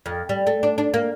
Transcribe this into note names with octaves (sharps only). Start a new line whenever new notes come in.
F2
G3
A3
D4
D4
A#3